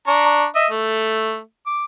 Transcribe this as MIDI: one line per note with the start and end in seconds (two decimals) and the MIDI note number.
0.07 0.45 62
0.07 0.45 82
0.07 0.45 85
0.55 0.67 75
0.55 0.67 76
0.70 1.39 57
1.67 1.85 86